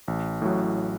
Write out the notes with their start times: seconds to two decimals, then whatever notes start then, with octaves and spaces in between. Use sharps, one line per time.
0.08 A1
0.42 A2 F#3